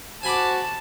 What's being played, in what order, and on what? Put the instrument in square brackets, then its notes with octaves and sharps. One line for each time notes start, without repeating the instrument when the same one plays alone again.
[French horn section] F#4 C5 [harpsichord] G#5 B5 D6 [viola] A5